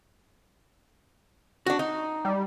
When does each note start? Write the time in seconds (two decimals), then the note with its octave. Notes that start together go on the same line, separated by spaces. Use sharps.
1.66 D4 F#4
1.79 D#4
2.25 G3